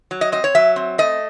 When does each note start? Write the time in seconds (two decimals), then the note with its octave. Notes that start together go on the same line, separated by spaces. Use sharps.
0.11 F#3
0.21 D#5
0.32 C4 D#5
0.44 C#5
0.55 F#3 E5
0.76 C4
0.98 A3 D#5